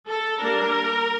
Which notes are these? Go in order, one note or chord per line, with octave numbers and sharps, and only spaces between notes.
A4
G3 A#3 D4 A#4